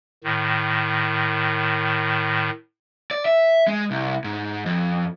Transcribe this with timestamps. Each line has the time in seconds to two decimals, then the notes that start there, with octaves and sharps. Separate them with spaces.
0.24 A2 D#3
3.11 D5
3.25 E5
3.67 G#3
3.91 C2
4.24 G#2
4.66 F2